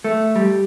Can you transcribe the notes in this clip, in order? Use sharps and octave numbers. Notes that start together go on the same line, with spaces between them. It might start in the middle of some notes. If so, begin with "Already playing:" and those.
A3
G3